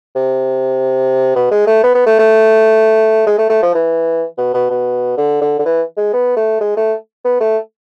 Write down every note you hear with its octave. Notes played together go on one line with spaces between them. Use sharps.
C3
B2
G#3
A3
B3
B3
A3
A3
G#3
A3
A3
F3
E3
B2
B2
B2
D3
D3
D3
E3
G#3
B3
A3
G#3
A3
B3
A3